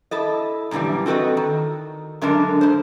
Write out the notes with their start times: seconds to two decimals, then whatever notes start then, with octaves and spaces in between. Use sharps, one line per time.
0.11 E4 A4 D#5
0.71 F#2 A#2 D3 E3 G3
1.06 C4 F#4 A4 B4 D#5
1.37 D#3
2.21 F#2 D3 G#3 D4 A#4
2.61 G#2 C5